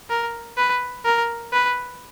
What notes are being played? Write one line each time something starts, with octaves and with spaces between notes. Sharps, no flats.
A#4
B4
A#4
B4